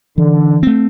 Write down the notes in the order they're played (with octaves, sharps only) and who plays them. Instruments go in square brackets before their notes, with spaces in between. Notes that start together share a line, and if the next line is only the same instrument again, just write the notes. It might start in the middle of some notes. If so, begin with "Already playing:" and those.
[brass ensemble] D3 [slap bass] E3
[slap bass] A3 C4